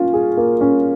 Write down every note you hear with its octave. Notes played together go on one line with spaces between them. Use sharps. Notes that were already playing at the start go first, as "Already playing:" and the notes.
Already playing: A#3 C#4 F4
G#4
A#3
C#4